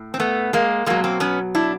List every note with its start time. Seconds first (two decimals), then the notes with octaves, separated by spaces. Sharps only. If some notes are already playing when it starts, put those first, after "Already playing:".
Already playing: A2
0.14 C4
0.20 A3 B3
0.53 G#3 A#3
0.86 B2 F#3 G#3 A#3
1.04 A#3 C4
1.20 B3 C#4
1.55 D4 E4